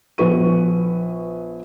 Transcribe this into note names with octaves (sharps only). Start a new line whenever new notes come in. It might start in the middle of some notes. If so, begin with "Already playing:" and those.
A#1 F3 B3 B4 C#6 D#7